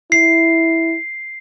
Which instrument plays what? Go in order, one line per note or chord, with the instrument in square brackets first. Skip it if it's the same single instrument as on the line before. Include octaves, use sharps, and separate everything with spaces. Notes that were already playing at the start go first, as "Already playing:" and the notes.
[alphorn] E4 [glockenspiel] C7